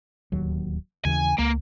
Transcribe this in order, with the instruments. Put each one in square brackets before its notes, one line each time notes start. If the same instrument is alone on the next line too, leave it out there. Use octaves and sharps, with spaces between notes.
[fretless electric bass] D1 D#2 F#3
[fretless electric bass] D#2 C#3 E3 [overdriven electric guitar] G#5
[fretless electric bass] C#2 [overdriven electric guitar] A#3